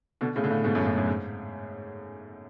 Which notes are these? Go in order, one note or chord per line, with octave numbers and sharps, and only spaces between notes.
B2 D3
A2 C#3
D3
A2 C#3
G#2 B2
F#2 A2
F#2 A2
F#2
G#2